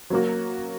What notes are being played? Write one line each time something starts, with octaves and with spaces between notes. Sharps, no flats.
F#3 A#3 F#4